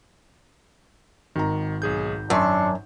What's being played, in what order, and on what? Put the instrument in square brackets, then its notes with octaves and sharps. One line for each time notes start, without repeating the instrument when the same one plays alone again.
[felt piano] G#1 A#5 [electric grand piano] D#3
[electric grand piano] B1 G#4 G6
[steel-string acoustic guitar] F#2 [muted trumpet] D4 [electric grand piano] C6 C#6 E6